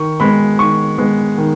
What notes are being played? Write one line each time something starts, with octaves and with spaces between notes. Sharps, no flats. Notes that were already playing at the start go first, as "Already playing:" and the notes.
Already playing: D#3 C#6
G#3 B3 B5
D#3 C#6
G#3 B3
D#3